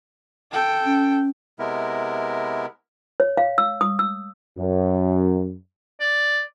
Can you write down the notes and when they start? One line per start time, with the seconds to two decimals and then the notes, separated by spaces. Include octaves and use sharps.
0.52 A4 G5
0.86 C#4
1.59 C3 G#3 B3 E4 A#4
3.20 C#5
3.37 F5
3.58 E6
3.81 D#6
3.99 E6
4.57 F#2
6.00 D5